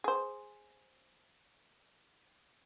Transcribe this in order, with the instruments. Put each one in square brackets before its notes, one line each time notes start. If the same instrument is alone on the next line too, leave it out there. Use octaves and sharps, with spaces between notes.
[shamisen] G#4 C5